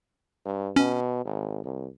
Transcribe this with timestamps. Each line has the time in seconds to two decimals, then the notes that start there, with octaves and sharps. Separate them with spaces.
0.46 G2
0.76 B2 C#4
1.25 G#1
1.64 C2